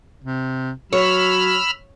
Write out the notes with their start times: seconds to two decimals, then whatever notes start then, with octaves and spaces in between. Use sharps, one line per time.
0.24 C3
0.93 F#3 C#5 B5 E6 F6